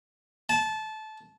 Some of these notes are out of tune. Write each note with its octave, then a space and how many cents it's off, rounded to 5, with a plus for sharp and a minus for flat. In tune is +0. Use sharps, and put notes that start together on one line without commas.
A5 -20